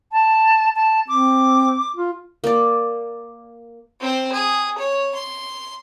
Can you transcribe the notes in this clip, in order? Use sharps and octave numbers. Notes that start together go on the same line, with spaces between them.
A5
A5
C4 D6
F4
A#3 D5
C4 C5
G#4
C#5
C6